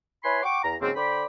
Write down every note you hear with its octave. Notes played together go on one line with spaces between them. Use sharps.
E4 B4 C#5 G#5 B5 C6
F#5 G5 C#6 D6
E2 A#5
G#2 C#3 F#3 A#3 C4
D3 C5 D5 G5 B5